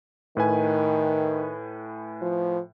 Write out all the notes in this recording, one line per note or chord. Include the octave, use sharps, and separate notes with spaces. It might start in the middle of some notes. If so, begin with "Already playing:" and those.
A2 D#3 B4 G#5
F3